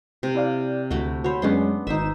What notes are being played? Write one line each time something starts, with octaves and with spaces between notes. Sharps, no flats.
C3
E4 D5 F5
D2 A3 E4 F#4
F#4 C5 C#5 B5
F#2 G#3 B3 C#4 D4 C6
G#1 D#4 C5 E5 E7